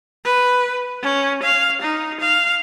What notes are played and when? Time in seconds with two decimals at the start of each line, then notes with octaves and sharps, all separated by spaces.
0.25 B4
1.02 C#4
1.43 F5
1.82 D#4
2.21 F5